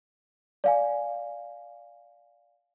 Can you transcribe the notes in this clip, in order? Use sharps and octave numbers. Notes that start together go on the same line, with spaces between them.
D5 F5 G#5